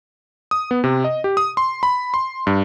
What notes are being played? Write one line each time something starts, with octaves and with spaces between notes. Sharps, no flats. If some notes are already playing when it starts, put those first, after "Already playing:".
D#6
B3
C3
D#5
G4
D#6
C6
B5
C6
G2